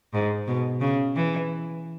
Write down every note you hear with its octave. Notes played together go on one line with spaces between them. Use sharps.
G#2
B2
C#3
E3